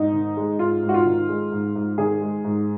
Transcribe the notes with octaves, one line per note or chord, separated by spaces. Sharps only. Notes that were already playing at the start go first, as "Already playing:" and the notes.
Already playing: G#2 D#4
D#3
G#3
G#2 F4
G#2
F#4
F4
D#3
G#3
G#2
G#2
D#3 G#4
G#3
G#2